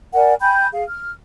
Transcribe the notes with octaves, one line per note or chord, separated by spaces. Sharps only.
A#4 D5 F#5 G#5
G5 G#5 B5 G6
G#4 F5
F6